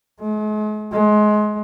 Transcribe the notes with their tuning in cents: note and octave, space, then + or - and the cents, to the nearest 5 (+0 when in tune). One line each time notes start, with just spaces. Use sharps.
G#3 +45
G#3 +25